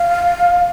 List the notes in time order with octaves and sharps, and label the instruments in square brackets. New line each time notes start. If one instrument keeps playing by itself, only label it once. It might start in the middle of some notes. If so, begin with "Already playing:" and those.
Already playing: [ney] F5